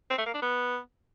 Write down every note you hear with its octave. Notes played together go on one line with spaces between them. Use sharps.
C4
A3
A#3
D4
B3